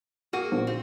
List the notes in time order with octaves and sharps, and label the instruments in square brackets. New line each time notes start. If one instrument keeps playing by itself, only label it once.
[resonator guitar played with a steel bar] A#3 F#4 [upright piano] G#4 D#7
[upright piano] A#1
[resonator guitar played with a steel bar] C4